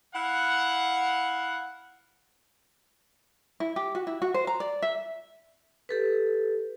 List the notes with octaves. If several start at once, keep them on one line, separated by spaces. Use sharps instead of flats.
E4 F5 F#5
E4
G4
F#4
E4
F#4
C5
A#5
D5
E5
G4 A4 B4